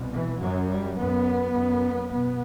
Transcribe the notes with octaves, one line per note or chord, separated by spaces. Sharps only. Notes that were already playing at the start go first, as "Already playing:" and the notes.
Already playing: C2 B2
E3
F#2 F#3
G3
F#2 B3
F#2
B2 B3